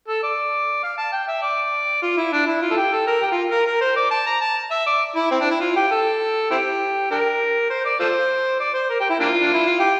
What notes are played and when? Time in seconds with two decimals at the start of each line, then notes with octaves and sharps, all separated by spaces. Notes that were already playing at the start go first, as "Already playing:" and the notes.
0.08 A4
0.23 D5
0.83 F5
0.98 A5
1.13 G5
1.28 E5
1.42 D5
2.02 F4
2.17 E4
2.33 D4
2.47 E4
2.62 F4
2.71 A4
2.77 G4
2.92 A4
3.07 A#4
3.22 G4
3.32 F4
3.52 A#4
3.66 A#4
3.81 C5
3.97 D5
4.11 A5
4.27 A#5
4.41 A5
4.71 E5
4.87 D5
5.16 E4
5.31 C4
5.41 D4
5.50 E4
5.61 F4
5.76 G4
5.91 A4
6.51 C4 E4 G4
7.11 D4 G4 A#4
7.70 C5
7.85 D5
8.00 F4 A4 C5
8.60 D5
8.74 C5
8.90 A#4
9.00 G4
9.10 E4
9.20 A#3 D4 F4
9.40 D4
9.54 E4
9.66 F4
9.80 G4